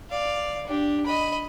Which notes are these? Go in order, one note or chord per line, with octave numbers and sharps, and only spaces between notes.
D5 F5
D4 G4
D#5 B5